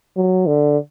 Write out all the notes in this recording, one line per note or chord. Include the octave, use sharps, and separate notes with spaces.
F#3
D3